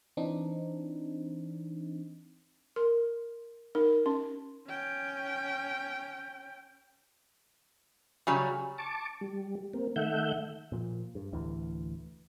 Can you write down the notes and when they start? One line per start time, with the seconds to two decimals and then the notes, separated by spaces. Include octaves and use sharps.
0.17 E3 C4 D4 D#4
2.76 A#4 C6
3.75 D#4 A#4
4.06 C#4 C6
4.67 C#4 G5
8.27 C#3 F#3 G3 G#5 C#6
8.78 A5 C#6 D6
9.21 G3
9.74 A#3 C4
9.96 D#3 A3 E5 F#5 G6
10.72 A#2 F3
11.15 G2
11.33 D1 D2 E3